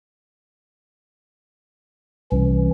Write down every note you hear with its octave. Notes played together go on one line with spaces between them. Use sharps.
C2 E3 C#4